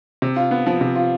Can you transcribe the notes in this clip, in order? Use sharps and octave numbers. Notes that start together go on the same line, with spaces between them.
C3
F4
B3
F3
C3
F4